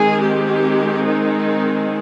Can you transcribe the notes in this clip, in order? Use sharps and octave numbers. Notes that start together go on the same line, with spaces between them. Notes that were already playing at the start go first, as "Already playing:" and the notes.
Already playing: D#3 G#3 C4 G#4
G4
D#4